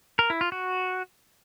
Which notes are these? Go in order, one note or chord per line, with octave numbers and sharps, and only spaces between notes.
A#4
E4
F4
F#4